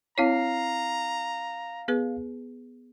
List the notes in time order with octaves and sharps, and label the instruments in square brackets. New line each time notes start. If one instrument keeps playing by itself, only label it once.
[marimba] C4 E4 C#5 [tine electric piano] F5 C7 [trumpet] A#5
[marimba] B3 G#4 B4